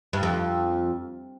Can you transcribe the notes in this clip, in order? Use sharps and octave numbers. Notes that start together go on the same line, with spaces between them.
G2
F2